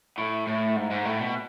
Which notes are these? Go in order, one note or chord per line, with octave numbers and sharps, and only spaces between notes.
A2
A2
G#2
G#2
A2
B2